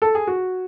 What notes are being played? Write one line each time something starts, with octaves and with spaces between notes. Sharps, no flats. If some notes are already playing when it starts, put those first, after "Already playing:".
A4
G#4
F#4